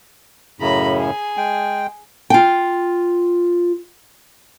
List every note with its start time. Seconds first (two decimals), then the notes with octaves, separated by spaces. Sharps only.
0.60 F#2 A2 C#3 A#5 B5
0.97 G#4
1.37 G#3 G5
2.30 F4 G5